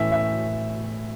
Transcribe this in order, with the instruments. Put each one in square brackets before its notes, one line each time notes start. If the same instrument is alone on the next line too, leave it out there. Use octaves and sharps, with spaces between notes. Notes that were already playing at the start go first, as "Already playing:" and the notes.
Already playing: [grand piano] A2 E3 A3 C#4 E5
E5